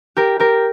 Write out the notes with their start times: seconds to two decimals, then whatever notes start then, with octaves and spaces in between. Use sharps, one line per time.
0.16 G4 A#4
0.39 G4 A#4